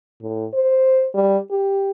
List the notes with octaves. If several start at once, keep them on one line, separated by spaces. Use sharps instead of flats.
A2
C5
G3
G4